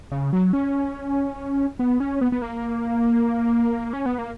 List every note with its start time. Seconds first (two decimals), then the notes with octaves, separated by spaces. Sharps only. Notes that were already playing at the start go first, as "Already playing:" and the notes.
0.12 C#3
0.33 F#3
0.53 C#4
1.79 B3
2.00 C#4
2.21 B3
2.32 B3
2.42 A#3
3.93 C#4
4.06 B3
4.18 A#3